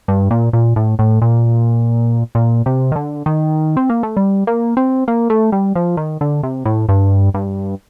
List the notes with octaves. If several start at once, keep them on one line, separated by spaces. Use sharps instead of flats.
G2
A#2
A#2
A2
A2
A#2
A#2
C3
D#3
D3
D#3
C4
A#3
A3
G3
A#3
C4
A#3
A3
G3
F3
D#3
D3
C3
A2
G2
G2